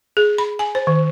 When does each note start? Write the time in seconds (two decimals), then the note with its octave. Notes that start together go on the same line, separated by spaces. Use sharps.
0.17 G#4
0.38 B5
0.59 G#5
0.75 C5
0.87 D#3